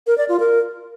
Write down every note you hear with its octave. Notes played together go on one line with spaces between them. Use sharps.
A#4
D5
F4
A#4